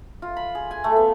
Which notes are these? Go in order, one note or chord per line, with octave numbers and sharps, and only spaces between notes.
F4
B5
G#4
G#5
A3
B3